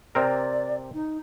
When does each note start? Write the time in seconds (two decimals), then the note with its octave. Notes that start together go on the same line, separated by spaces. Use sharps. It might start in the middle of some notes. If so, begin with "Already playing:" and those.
0.15 C3 C4 A#4 D5
0.94 D#4